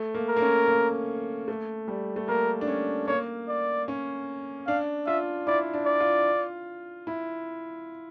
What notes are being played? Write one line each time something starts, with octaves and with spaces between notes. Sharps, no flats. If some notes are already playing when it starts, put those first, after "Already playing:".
Already playing: A3
A#3
A#4
A#3
C#4
A#3
A3
G3
A3
A#3 A#4
D4
C#4
A#3 C#5
D5
C#4
D4 F5
F4 E5
E4 D5
D4
D5
F4
E4